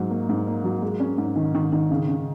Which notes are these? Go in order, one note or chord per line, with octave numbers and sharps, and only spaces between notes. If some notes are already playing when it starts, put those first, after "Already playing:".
Already playing: G#2 F#3
A#3
G#2
A#3
F#3
G#3
C#4
G#2
D#3
D#3
D#3
C#3
C#3